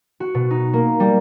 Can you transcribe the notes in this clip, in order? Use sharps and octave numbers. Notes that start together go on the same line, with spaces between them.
F#4
B2
D#4
A#3
G3